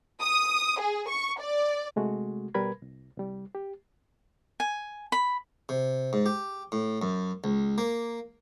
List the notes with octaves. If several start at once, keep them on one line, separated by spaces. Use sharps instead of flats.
D#6
G#4
C#6
D5
C3 G#3 A3 F#4
B2 G3 A#4 B4 B5 G#6
C2
C2 G3
G4
G#5
B5
C3
G#2
G4
A2
F#2
C#2
A#3